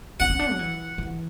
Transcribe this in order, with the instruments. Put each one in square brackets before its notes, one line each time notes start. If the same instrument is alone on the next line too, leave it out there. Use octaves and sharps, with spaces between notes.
[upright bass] D4 [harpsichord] F#5
[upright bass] C#4
D4
F#3
E3
E3